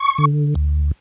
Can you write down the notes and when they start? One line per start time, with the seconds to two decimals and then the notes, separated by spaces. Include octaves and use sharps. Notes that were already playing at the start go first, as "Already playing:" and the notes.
Already playing: C#6
0.18 D3
0.55 D2